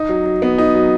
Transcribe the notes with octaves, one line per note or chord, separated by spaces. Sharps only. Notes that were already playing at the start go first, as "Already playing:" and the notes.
Already playing: D#4
F#3
F#3
B3
D#4
F#3